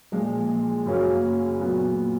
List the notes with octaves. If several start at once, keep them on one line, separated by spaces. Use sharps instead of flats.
A#2 F3 G#3
F#2 C#3 F#3 A#3 C#4
A#2 F#3 B3